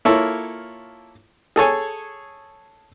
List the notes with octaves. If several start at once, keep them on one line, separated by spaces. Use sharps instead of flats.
A#3 E4 F4 A4 C#5
G#4 A4 C#5 G#5